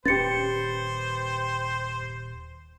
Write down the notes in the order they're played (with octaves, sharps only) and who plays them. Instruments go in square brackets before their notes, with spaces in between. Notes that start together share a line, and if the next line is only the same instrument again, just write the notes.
[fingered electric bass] D#1 C#4 [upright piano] G4 B4 [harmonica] C5 [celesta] A6 C#7